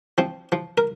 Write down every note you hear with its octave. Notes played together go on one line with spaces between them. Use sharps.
F3 C4
F3
A#4